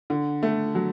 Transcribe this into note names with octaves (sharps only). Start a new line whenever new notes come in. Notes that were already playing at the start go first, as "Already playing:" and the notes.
D3
A3
F#3